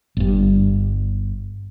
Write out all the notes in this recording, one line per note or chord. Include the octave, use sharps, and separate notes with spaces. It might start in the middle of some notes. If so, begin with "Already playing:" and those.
G1 G2